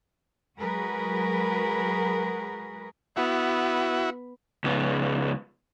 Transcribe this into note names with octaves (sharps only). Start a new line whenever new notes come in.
F#3 G#3 F#4 G#4 A#4 B4
B3 E4 F#4
C#2 B3